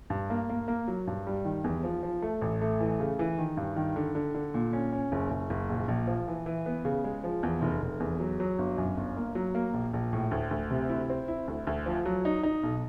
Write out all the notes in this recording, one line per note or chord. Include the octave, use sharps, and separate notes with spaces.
G2
A#3
A#3
A#3
F#3
G2
G3
D#3
E2
F3
F3
A3
A1
A3
E3
C#3
E3
D#3
G2
D#3
D3
D3
D3
A#2
C#4
C#4
F#1
F#1
F#1
A#1
A#1
F3
E3
E3
B3
C#3
G#3
F3
E2
F1
F1
E2
F#3
F#3
G1
F#2
G1
A#3
F#3
A#3
A#1
A#1
A2
D2
D2
C3
E4
C4
E4
D2
D2
F3
F#3
D#4
D#4
B1